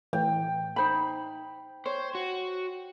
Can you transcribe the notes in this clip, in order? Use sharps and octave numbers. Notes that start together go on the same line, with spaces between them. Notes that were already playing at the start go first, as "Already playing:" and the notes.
A2 E3 G5
D#4 C5 B5
C5 C#5
F#4